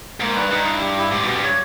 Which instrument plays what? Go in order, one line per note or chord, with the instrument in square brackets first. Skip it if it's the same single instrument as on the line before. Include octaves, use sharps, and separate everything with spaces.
[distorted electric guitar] G#2 [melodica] A#3
[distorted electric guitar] G2 [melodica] B4
[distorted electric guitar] G2 [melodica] D#4
[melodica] E4
G4
E4
[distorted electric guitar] G#2 [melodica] G4
[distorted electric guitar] B2 [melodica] G4
[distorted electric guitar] G2
[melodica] C#5